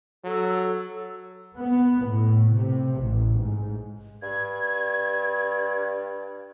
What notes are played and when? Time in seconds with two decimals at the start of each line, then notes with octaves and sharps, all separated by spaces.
0.24 F#3 A4
1.58 B3
2.05 A2
2.54 C3
2.99 A1
3.39 G#2
4.22 G2 G#6